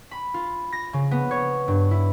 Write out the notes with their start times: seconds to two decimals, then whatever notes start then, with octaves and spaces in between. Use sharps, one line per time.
0.11 B5
0.34 F4
0.73 A#6
0.93 C#3
1.11 B3
1.31 C#5
1.68 G2
1.91 E4